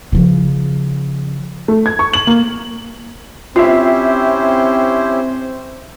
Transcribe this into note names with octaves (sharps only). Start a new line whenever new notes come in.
C#3 F3
A3
G#6
C#6
F#7
A#3
C4 C#4 E4 F4 G4 C5 E5 C7